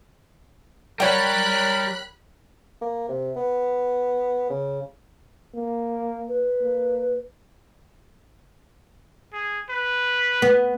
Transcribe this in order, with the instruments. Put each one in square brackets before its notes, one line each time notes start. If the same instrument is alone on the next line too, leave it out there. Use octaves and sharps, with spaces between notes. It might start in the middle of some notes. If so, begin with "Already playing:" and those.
[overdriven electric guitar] G3 [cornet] A#4 [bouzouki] C#5 G5 [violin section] B5 F#6
[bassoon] A#3
C3
B3
C#3
[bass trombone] A#3
[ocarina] B4
[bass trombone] A#3
[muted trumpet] G#4
B4
[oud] B3